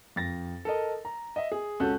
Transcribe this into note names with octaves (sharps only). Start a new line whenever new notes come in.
F2 A6 A#6
A4 A#4 D#5
A#5
D#5 E5
G#4
C#2 C#4 F#4 A4 F#6 G6